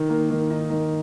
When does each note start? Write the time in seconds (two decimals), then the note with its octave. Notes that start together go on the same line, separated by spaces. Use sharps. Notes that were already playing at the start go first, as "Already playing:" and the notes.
Already playing: D#3
0.10 A#3
0.30 D#3
0.50 D#4
0.70 D#3